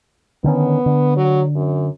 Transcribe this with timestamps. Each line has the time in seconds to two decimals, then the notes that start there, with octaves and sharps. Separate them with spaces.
0.44 D3 D#3 B3 C#4
0.86 D3
1.16 F#3
1.55 F#2